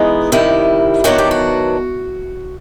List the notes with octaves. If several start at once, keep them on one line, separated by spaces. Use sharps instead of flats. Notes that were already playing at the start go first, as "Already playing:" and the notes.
Already playing: E3 G#3 B3 D#4
C3 D#3 G3 E4
D#3 F#3 B3 D4 F#4
G4
F#4